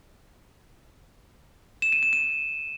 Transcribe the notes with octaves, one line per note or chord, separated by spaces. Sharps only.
E7
D#7
D#7
D#7